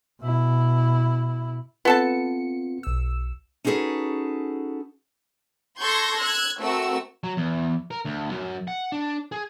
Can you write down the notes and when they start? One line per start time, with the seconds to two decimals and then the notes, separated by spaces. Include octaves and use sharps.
0.20 B2 E4
1.85 B3 C4 F4 A4 A5 C#7
2.83 B1 E6
3.65 C#4 D#4 F#4 G#4 A4 B4
5.79 A4 C6 C#6 G6 G#6 A#6
6.20 E6 F#6 G#6
6.60 A3 C4 F#4 A#4 E6
7.24 F#3
7.37 E2
7.91 A#4
8.05 D2
8.31 F#2
8.68 F#5
8.92 D4
9.32 G#4